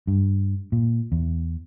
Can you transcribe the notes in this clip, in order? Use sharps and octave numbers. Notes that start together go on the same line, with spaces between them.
G2
A#2
E2